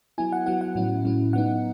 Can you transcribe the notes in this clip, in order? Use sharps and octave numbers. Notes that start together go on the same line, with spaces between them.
F#3 B3 E4 G#5
F#5
F#3 B3 E4 F#5
F#5
A2 F#3 C#4 E4
A2 F#3 C#4 E4
F#3 B3 D#4 F#5